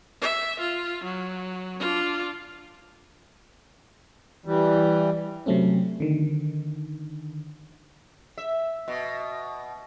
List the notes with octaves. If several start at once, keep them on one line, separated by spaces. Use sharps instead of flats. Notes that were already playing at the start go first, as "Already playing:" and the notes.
E5
F4
F#3
D4 F4
E3 G3
C3 F#3 A3 C4 C#4
D3 D#3
E5
B2